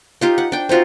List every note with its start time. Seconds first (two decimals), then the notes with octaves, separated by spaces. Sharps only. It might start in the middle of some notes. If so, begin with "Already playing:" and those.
0.21 D#4 F4 G4
0.38 F#5
0.52 D4 G5
0.69 C4 D#4 F4 F#4